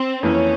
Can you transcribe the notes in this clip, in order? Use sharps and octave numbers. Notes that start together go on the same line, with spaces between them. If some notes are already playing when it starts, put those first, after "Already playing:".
Already playing: C4
F2 E3 A#3 C#4 E4